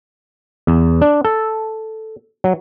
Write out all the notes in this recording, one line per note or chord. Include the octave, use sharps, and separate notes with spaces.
E2
D4
A4
F#3